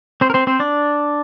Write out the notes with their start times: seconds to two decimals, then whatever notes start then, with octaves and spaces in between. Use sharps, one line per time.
0.21 C4 C5
0.30 A#4
0.34 C4 C5
0.47 C4 C5
0.60 D4 D5